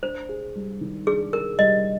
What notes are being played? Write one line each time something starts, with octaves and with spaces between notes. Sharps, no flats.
D4 C5
G#4
G3
D#3
D4 G#4
G#4 A#4
G3 D#5